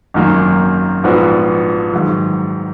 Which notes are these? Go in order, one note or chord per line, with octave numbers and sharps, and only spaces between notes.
G#1 F#2 D#3 F#3 A#3
A#1 G#2 F3 B3 F#4
G#2 D#3 F#3